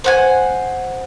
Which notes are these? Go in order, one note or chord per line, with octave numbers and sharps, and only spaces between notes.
C5 F#5 G#5